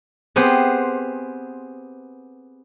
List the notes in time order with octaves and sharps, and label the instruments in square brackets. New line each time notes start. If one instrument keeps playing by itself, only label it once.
[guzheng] B3 C4 G4 G#4 B4 C5